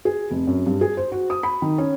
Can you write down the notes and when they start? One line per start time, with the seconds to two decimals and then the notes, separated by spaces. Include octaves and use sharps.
0.05 G#4
0.31 F1
0.47 F#2
0.66 G2
0.81 G#4
0.97 C5
1.12 F#4
1.30 D#6
1.43 B5
1.62 D#3
1.78 C#4